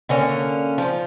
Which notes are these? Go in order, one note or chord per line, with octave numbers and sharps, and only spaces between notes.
D3 A#3 C#4
F3